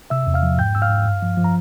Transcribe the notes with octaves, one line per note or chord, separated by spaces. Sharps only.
C3 E5 E6
E2
F5 F6
F3
G#2 G5 G6
G#2 E6
F5 F6
G#2
G2
F3
F3
A#5